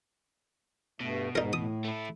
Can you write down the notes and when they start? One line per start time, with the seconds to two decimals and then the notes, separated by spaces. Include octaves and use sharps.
1.00 G2 B2 A3
1.35 G#2 D#4 A#4
1.53 A2 D#6
1.84 A3 E4